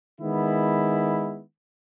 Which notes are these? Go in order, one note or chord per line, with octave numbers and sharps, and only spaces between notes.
D#3 G#3 B3 E4